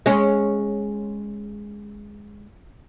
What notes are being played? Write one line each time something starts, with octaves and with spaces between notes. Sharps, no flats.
G#3 C#4